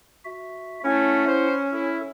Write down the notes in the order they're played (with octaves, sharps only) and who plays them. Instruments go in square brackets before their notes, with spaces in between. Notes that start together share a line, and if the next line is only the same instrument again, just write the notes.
[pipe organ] F#4 E5
[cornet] A3 [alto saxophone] C#4 [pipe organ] E4 F#5
[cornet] C5
[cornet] E4 [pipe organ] A4